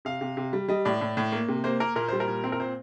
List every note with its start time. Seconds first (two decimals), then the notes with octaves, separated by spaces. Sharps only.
0.05 C3 F5
0.21 C3
0.37 C3
0.53 G3
0.68 G3 D#5
0.85 A2 D5
1.01 A2
1.17 A2
1.32 A#3
1.48 C3
1.64 A#3 C5
1.80 A#3 A#4
1.95 A#2 A#4
2.08 G3 C5
2.20 A#4
2.27 A#2
2.44 C4
2.52 A#4
2.60 A#2 C5